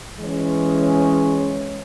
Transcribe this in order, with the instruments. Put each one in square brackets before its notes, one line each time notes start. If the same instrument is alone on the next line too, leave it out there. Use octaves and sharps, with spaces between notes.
[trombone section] E3 G#3 C#4